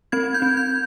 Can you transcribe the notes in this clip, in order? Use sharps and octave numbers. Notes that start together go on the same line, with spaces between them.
C4 G#6
G6
C4
G6